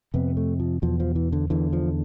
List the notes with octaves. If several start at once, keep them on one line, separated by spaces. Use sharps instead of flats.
F2 C3 B3
A3
F3
E2 B2 F3
F3
E3
D3
E2 D3 E3
F3